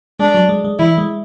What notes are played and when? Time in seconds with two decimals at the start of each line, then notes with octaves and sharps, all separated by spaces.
0.19 G#3 D4
0.35 F#3
0.49 G#3
0.64 G#3
0.79 E3 E4
0.98 G#3